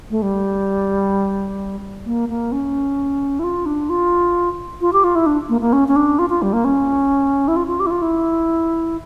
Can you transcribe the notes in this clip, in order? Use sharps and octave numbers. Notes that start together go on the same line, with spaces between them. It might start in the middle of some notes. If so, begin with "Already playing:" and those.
A3
G3
A#3
A#3
C#4
E4
F4
D4
F4
F4
G4
F4
E4
D4
A#3
A#3
C#4
C#4
D4
F4
F4
G3
A#3
C#4
E4
F4
F4
G4
E4
F4
E4